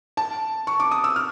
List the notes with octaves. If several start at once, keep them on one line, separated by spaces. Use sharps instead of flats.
A5
C#6
D6
D#6
E6
F6